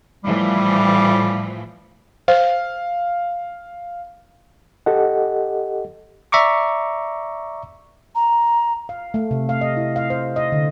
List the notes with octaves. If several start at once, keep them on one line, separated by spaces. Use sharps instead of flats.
A2 E3 F3 G3
C5 F5
G4 A4 D#5 F#5
D5 E5 A#5 C#6 D6
A#5
F5
A3
C3
F5
D#5
E4
F5
C5
D#5
D3